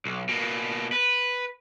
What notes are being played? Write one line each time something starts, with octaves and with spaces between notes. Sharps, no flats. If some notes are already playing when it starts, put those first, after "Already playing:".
B1
B2 A#3
B4